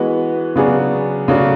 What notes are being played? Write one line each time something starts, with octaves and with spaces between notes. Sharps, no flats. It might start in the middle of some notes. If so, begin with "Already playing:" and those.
Already playing: E3 G#3 B3 F#4 B4
C#3 F#3 B3 D4 G#4
C#3 F#3 A3 D4